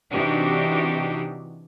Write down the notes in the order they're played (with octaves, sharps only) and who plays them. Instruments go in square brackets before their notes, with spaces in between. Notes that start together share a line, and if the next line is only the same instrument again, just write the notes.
[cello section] C3 E3 D4 D#4 F#4 G4